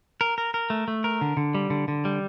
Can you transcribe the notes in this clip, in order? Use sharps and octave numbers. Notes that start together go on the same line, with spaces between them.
A#4
A#4
A#4
A3
A3
A#4
D3
D3
G3
D3
D3
G3